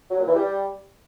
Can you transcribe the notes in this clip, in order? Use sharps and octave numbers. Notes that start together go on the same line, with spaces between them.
F#3
A#2
E3
G3